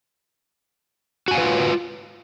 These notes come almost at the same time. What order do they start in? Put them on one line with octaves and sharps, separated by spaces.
F#4 G#5 F5 B4 F4